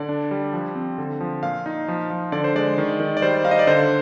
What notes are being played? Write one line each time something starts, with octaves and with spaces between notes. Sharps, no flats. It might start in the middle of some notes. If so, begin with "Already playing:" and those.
Already playing: D3 D5
D4
G3
F3
C4
D3
F3
A#2 F5
D#4
F3
F3
D3 D5
C5
G#3 D5
D#3
D#3
D5
G3 C5
D#4 F5
D#5
D5
D3 C5